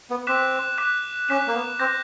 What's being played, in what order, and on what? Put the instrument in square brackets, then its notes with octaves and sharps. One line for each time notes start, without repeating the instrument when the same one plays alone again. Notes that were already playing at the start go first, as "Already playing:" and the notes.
[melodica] B3
[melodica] C4 [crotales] D6 F#6 B6 E7
[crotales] D6 F#6 B6 E7
[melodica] C#4 [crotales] D6 F#6 B6 E7
[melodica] A#3
B3
[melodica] C4 [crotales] D6 G6 A#6